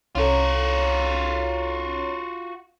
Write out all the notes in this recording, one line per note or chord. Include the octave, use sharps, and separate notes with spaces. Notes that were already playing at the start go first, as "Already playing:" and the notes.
C2 C#4 F4 F#4 A4 C#5 A#5